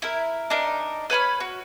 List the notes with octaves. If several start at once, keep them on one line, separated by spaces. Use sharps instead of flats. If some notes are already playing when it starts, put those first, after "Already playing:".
E4 A#4
D4 D#4 A#4
B4 C#5 B5 F6
F#4